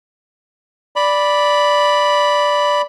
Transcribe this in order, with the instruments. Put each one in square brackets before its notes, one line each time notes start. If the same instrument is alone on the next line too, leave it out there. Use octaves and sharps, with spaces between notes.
[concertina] D5 B5